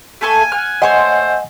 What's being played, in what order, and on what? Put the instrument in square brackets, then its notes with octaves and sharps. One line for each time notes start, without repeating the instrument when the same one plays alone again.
[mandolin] A3 A4 C#6 [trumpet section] A#3 G#5
[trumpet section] F#5 G#5 [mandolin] F6
[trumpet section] A3 C5 [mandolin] C#5 C6 [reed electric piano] D#5 F#5 G#5